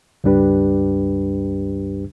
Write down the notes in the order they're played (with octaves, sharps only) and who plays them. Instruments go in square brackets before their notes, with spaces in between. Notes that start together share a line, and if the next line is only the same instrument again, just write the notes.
[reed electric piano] C#2 G2 G3 D4 G4 B4